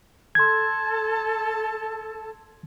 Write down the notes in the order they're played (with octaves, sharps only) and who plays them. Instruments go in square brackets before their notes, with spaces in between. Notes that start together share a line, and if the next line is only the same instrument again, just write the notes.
[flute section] A4 A5 [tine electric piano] C6 G#6